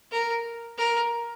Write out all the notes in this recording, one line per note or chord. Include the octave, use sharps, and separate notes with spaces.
A#4
A#4